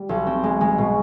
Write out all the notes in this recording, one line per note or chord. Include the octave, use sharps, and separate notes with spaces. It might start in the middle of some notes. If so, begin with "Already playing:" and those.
Already playing: G3
B1
C4
G#3
G#3
B2